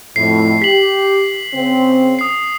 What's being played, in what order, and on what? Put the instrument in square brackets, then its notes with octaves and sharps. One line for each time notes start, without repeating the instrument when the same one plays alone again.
[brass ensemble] F2 A2 [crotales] C7
[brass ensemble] G4 [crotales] B6 F#7
[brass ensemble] C#3 C4
[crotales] D#6 C7